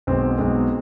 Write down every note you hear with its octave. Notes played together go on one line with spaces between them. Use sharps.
B1 B2 G#3 C4
B1 B2 G#3